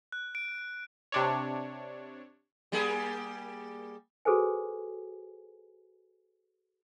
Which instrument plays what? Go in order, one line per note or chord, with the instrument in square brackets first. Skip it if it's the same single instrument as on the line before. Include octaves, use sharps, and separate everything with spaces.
[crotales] F#6
D7
[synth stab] C3 D4 C#5
[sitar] G3 A#3 G#4
[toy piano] F#4 G#4 A4 B4 C5 G#5